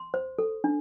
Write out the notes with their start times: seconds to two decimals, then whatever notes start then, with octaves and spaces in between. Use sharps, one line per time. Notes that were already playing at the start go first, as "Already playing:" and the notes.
Already playing: C6
0.14 C5
0.39 A4
0.64 D4